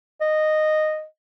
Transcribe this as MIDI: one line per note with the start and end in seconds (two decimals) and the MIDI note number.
0.21 1.04 75